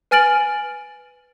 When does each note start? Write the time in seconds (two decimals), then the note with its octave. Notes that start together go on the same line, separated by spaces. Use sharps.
0.11 B4 G#5 F6 A6 D7 F#7